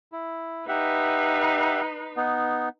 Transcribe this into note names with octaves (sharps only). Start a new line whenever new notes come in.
E4
D#4 G4 B4 E5 F#5
B3 D#4